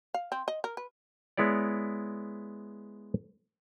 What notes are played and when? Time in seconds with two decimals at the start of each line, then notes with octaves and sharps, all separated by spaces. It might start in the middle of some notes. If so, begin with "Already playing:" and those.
0.14 F5
0.32 C4
0.48 D#5
0.64 A#4
0.77 B4
1.37 G#3 B3 E4 C#5 D5